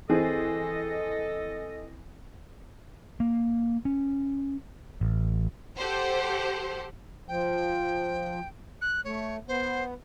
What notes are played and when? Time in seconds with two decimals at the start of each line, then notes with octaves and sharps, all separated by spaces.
0.09 E3 C4 G#4 A4 D#5
3.20 A#3
3.85 C#4
5.01 A1
5.77 G4 A4 C5 F#5
7.28 F3 G5
8.81 F#6
9.05 A3 C#5
9.48 B3 C5